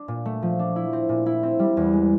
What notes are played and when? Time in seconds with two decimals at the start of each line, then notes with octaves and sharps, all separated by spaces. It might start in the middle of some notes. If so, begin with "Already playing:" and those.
Already playing: D4
0.08 A#2
0.26 A3
0.42 F3
0.59 D4
0.76 E4
0.93 C4
1.09 A#2
1.26 E4
1.43 C4
1.59 G3
1.77 E2
1.93 G#3